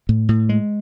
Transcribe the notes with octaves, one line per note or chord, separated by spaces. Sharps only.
A2
A2
G#3